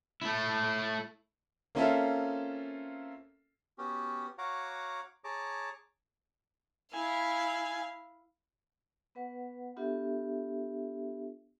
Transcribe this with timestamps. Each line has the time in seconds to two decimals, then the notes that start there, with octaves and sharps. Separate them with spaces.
0.21 A3 E4
1.75 A#3 C4 C#4 F4 A4 E5
3.78 B3 C#4 F#4 G4
4.38 F#4 C#5 F5 F#5 A#5 D6
5.24 G#4 C#5 A5 A#5 D6
6.93 E4 F5 G#5
9.15 B3 B4 F#5
9.77 B3 D4 F4 G4 A4 E5